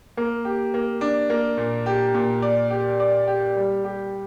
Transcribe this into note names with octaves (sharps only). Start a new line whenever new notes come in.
A#3
G4
A#3
D4
A#3
A#2
G4
A#2
D5
G4
D5
G4
G3
G4